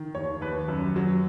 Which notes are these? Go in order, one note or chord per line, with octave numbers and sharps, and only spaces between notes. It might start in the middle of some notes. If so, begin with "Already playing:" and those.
Already playing: D#3
D#2 C#5
D#2 B4
F#2
F#3